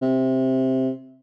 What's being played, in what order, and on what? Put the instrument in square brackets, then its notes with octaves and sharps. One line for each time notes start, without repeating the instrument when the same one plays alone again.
[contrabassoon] C3